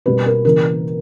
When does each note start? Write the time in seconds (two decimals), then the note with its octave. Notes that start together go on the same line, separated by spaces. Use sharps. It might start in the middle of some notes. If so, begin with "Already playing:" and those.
0.06 B2 G3 A#3 B4
0.26 A#4
0.44 C#3 E3 A#3 A#4